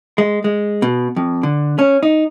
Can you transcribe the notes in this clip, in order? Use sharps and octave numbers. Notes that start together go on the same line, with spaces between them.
G#3
G#3
B2
F2
D3
C#4
D#4